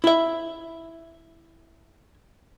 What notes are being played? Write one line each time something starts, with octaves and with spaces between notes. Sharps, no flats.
E4 E5